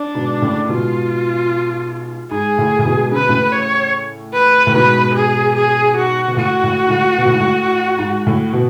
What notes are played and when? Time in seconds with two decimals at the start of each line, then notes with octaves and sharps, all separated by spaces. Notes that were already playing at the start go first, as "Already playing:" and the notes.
Already playing: D4
0.15 G#2 B2
0.42 A2 C#3
0.69 G#2 B2 F4
2.31 G#2 G#4
2.58 A2
2.79 A2
2.85 G#2 B2
3.12 C#3 B4
3.20 B2
3.29 A2 C#3
3.52 C#5
4.34 B4
4.67 A2
4.74 G#2 B2 B4
5.15 G#4
5.55 G#4
5.97 F#4
6.28 B2
6.37 A2 F#4
6.64 A2
6.87 G#2
6.90 A2
7.18 B2
7.26 A2
7.33 G#2
7.40 A2
7.99 G#2
8.27 A2
8.53 B2